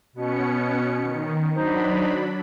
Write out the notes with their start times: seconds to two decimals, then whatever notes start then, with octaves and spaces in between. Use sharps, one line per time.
0.15 B2 B3 C#4 C#7
1.02 D#3
1.56 F#3 D4 D#4 C5 B5